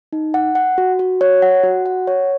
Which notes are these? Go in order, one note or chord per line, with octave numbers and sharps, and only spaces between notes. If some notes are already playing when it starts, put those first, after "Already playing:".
D#4
F#5
F#5
F#4
F#4
C#5
F#5
F#4
F#5
C#5